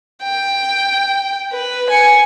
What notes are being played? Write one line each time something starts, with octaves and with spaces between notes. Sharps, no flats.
G5
B4
G#5 C#7